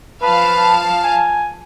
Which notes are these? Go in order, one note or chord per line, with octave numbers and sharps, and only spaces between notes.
F3 B4 F5 A5
G#5